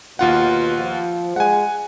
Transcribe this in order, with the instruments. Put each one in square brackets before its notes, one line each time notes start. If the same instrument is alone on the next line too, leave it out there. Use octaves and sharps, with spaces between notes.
[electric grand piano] D#2 F4 F#5 [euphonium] B2
[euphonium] F3
[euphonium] G#3 [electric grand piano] F#5 G#5